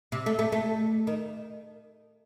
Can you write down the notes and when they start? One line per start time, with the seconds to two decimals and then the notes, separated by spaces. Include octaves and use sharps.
0.12 C3
0.26 A3
0.39 A3
0.52 A3
1.07 D#3